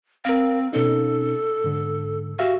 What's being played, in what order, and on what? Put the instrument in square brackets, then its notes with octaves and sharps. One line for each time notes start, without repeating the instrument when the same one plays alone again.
[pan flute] C4 [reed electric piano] A#4 F5
[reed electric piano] B2 C#4 D#4 [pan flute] A4
[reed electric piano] G#2 D3
[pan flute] F#4 [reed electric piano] G4 E5 F5